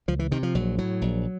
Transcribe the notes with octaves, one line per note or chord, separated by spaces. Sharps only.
C#2 F3
E3
C3 D#3
F3
A#1 F#3
A2 F#3
A#1